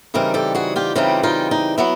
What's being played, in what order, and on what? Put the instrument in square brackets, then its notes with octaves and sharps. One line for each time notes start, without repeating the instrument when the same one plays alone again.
[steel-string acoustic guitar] C#3 E3 G3 C4 D#4 G#4 A#4
G4 A4
F#4 G#4
F4 G4
C#3 E3 G3 C4 D#4 F4 G4
D#4 F4
D#4
F#3 B3 E4